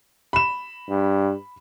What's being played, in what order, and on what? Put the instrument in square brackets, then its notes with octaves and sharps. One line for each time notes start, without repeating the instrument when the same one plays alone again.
[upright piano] B5 E7
[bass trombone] G2